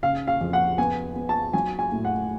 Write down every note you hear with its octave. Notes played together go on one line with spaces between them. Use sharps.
C#3 F5
F5
F2
F#5
B3 G#5
B3
A5
F#3 G#5
G#5
A2
F#5